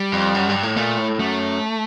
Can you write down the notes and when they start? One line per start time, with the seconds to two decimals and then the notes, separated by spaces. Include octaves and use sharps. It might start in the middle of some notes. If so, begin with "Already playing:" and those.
Already playing: G3
0.13 F2
0.35 F#2
0.49 G2
0.63 A2
0.77 A#2 A3
0.98 A2
1.19 F#2 A3